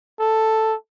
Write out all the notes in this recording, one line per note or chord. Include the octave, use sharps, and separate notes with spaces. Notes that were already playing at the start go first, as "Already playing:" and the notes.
A4